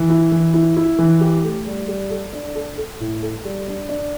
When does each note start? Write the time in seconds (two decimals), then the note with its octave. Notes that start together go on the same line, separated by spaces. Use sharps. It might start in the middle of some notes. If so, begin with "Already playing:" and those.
Already playing: E3
0.10 E4
0.32 E3
0.54 E4
0.77 E4
0.99 E3
1.21 G4
1.44 A3
1.66 G3
1.88 G3
2.10 A4
2.33 D4
2.55 A4
2.78 A4
3.00 A2
3.22 A4
3.45 G3
3.67 D4
3.89 D4